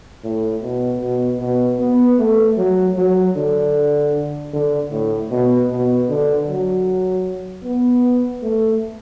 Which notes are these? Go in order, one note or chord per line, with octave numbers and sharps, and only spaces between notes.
A2
B2
B2
B2
B3
A3
F#3
F#3
D3
D3
A2
B2
B2
D3
F#3
B3
A3